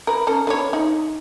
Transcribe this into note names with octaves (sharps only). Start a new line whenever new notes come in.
A#4 B4
C#4 A4 A#4
D4 B4 C#5
D#4